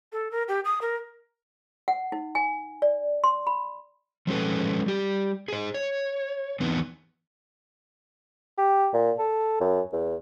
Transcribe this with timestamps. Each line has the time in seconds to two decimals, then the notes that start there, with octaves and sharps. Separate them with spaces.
0.12 A4
0.31 A#4
0.48 G4
0.65 D#6
0.81 A#4
1.88 F#5
2.12 D#4
2.35 G#5
2.82 D5
3.24 C6
3.47 B5
4.27 F3 G#3 C#4 G#4 A4 B4
4.86 G3 G4
5.48 G#4 C5
5.74 C#5
6.60 E3 B3 C4 D#4 B4
8.58 G4
8.93 A#2
9.19 A4
9.61 F#2
9.92 E2